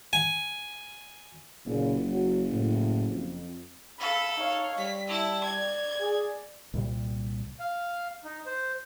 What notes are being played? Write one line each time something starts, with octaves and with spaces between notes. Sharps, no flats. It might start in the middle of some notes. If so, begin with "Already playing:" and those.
G#5
F#1 A#2 C#3
F#3
A2
F2
A4 F5 B5
D#4 C#5 F5
G3 B6
E4 A5
D5 G#6
G#4
C2 A#2 G3
F5
D#4
C5